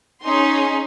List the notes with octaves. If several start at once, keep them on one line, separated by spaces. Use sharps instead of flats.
C#4 D#4 G#4 G#5 C6